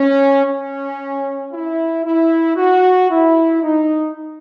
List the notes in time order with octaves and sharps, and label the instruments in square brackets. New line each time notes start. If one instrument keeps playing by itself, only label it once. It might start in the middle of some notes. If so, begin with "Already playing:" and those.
Already playing: [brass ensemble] C#4
C#4
E4
E4
F#4
E4
D#4